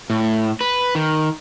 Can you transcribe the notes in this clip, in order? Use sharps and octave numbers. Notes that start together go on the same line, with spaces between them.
A2
B4
D#3